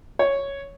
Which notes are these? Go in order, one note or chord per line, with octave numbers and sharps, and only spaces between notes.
C#5